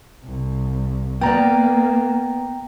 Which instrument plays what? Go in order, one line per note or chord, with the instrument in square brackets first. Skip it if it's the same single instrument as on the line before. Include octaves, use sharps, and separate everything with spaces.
[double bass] C2
[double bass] A#3 [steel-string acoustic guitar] B3 D5 [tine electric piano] G5 A#5